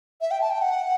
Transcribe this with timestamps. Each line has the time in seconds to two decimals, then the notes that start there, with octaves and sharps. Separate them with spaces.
0.21 E5
0.31 G5
0.41 A5
0.50 G5
0.61 F#5